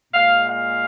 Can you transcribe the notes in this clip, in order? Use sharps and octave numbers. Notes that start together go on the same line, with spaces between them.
A#2 G#3 F5
F5